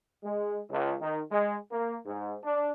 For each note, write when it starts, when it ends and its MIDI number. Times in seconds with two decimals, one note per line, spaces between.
0.24 0.59 56
0.70 0.93 37
1.01 1.20 51
1.32 1.56 56
1.71 1.96 58
2.07 2.35 44
2.43 2.72 62